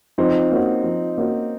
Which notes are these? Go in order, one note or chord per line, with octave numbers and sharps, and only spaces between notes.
F3 C4 D#4
A#3 C#4 F#4
F3
A#3 C#4 F#4